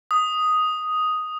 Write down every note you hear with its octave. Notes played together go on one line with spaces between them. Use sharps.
D#6